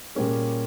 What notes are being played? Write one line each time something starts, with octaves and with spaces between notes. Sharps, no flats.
A#2 G3 A#3 C#4 G#4